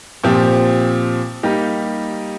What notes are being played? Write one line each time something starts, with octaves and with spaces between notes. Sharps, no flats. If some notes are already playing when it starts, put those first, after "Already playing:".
A#2 F3 C4 G4
G3 A#3 D#4 G4